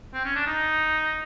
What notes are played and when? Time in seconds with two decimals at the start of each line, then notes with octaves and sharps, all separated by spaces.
0.14 C4
0.25 C#4
0.36 D4
0.47 D#4